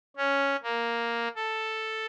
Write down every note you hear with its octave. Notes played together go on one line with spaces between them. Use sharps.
C#4
A#3
A4